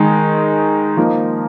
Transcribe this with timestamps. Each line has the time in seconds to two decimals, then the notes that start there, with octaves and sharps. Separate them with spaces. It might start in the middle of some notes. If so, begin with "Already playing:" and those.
Already playing: D#3 G#3 D#4
0.97 F3 A#3 D#4 A#4